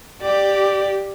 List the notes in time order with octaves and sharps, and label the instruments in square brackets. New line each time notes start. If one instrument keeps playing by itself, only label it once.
[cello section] G4 [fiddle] D5